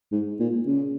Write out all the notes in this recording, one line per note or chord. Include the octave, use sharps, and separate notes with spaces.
G#2
A#2
C#3